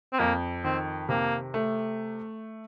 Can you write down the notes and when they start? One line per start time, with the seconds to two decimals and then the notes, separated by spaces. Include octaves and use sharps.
0.13 C4
0.19 F2 A#3
0.64 D#3 C4
1.09 C3 A#3
1.54 A3